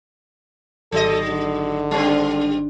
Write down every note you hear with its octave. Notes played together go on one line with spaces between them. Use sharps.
G#1 F#3 A4 D#5
D3
G3 C4 D4